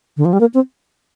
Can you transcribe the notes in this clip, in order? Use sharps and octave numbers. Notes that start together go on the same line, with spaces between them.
D3
F3
G3
A#3
C4